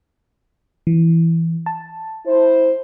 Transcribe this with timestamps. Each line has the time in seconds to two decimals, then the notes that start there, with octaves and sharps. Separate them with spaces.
0.87 E3
1.66 A5
2.26 E4 C5